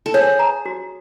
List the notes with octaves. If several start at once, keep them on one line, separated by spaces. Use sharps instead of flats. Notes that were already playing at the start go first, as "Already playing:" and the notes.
A4
G#4 C#5
A#5
F#4